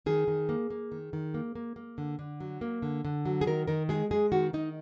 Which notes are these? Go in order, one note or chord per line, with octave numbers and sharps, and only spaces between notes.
D#3 G#4
D#3
A#3
A#3
D#3
D#3
A#3
A#3
A#3
D3
D3
F#3
A#3
D3
D3
F#3
G#4
D#3 A#4
D#3 A#4
G#3 G#4
G#3 G#4
D#3 F#4
D#3 D#4